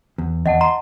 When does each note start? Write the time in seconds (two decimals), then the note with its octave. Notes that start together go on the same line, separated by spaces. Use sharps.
0.18 E2
0.46 E2 D#5 F#5 A5
0.61 A#5 C6